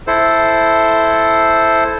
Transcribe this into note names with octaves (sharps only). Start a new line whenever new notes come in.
E4 A4 C5